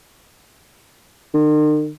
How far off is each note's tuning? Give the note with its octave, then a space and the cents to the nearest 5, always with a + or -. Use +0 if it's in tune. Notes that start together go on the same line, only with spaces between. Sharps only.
D#3 -45